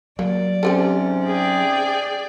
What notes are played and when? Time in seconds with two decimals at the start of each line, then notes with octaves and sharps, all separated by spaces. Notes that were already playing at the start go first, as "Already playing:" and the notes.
0.19 F#3 A#3 D5
0.63 G#2 C3 C4 C#4 G4 A4
1.26 G#4 D5 G5